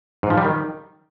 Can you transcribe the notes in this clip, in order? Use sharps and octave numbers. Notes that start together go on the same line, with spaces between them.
G#2
F3
G3
D#3